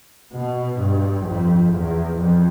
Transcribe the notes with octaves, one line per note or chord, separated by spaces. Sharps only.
B2
G2
F2
E2
F2